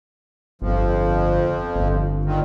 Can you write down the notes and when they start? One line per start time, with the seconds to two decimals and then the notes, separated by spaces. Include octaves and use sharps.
0.62 G1 F2 F3
1.75 G1
2.25 A#2 D#3